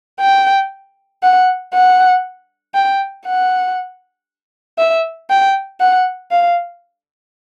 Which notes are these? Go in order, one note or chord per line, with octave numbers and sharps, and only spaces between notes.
G5
F#5
F#5
G5
F#5
E5
G5
F#5
F5